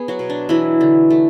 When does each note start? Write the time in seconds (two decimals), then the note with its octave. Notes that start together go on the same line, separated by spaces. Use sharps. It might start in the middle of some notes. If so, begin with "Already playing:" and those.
Already playing: B3 G#4
0.08 F#3 F#4
0.19 B2
0.30 D4
0.49 E3 F#3 E4
0.81 D3
1.10 A3